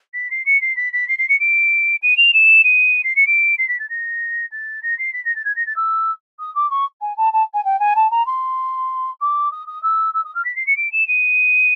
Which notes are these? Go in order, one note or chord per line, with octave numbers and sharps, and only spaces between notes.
B6
C7
C#7
C7
B6
B6
C7
C7
C#7
D7
D#7
F7
E7
D#7
C7
C#7
D7
C7
B6
A6
A#6
A6
A#6
C7
B6
A#6
A6
G#6
A#6
A6
E6
D#6
D6
C#6
G#5
A5
A5
G#5
G5
G#5
A5
A#5
C6
D6
D#6
D#6
E6
E6
D#6
F6
B6
C7
C#7
D7
E7
D#7